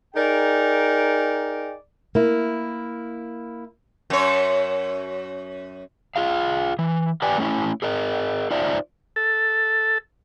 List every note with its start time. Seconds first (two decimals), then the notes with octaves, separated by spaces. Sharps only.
0.15 D#4 G#4 A#4 D5 G5
2.15 A#3 E4
4.10 F#2 C#5
6.16 F4 G#4 F5
6.79 E3
7.22 G4 B4 D5 G5 G#5
7.38 A3 C#4 E4
7.82 G#4 A#4 D#5
8.50 D#4 F4 C5 D5 E5
9.16 A4